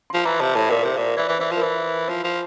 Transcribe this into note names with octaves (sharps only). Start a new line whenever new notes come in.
F3 C6
E3 A#5
C3 A5
A2 A5
A#2 A#4
C3
A#2 C5
E3 D5
E3
E3 C5
F3
A#4
E3 C5
F3 C5
F3